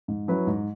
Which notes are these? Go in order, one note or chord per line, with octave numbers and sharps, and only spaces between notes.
G#2
F#3 C#4 E4 B4
G#2